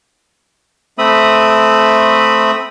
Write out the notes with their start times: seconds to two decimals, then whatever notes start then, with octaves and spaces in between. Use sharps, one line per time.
0.98 A3 C4 E5 B5 D#6